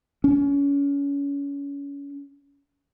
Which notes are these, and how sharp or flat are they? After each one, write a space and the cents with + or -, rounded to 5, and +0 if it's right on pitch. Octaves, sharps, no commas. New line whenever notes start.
C#4 +30